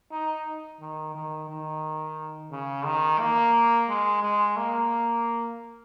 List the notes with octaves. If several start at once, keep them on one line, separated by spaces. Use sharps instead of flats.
D#4
D#3
D#3
D#3
C#3
D#3
A#3
G#3
G#3
A#3